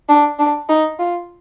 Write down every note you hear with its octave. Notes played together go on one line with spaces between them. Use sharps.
D4
D4
D#4
F4